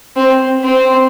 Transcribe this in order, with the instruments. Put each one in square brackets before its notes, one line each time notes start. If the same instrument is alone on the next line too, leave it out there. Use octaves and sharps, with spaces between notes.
[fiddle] C4
C4